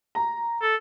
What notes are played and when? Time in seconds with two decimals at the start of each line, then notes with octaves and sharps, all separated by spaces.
0.15 A#5
0.62 A4